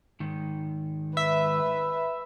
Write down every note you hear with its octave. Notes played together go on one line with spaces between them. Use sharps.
G#2 D#3
B4 E5